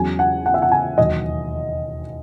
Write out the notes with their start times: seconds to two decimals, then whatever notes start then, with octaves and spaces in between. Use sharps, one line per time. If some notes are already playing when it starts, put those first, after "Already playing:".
Already playing: E2 C#3 F#3 G#5
0.19 F#5
0.46 F#5
0.54 E5
0.62 F#5
0.72 G#5
0.98 E1 D#2 D#3 F#3 D#5